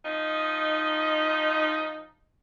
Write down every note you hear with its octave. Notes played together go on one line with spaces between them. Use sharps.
F3 D#4